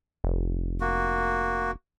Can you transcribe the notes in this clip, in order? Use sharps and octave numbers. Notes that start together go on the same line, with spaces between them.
F1
A#3 F#4